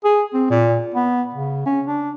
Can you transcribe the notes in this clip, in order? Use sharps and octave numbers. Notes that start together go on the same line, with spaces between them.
G#4
C4
A#2
B3
C#3
C#4
D4